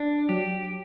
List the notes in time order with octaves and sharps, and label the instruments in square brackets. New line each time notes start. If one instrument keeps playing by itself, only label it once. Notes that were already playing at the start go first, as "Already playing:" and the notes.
Already playing: [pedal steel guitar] D4
[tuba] F#3 [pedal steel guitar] G4